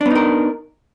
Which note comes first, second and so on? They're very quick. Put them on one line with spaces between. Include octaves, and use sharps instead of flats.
D4 B3 D#4 A#4